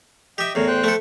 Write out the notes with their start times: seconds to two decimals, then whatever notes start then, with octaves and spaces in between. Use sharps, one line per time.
0.38 G4 D#5 E5 G5
0.55 E2 A2 A#4 C#5
0.67 C5 G5 F#6
0.84 A3 A4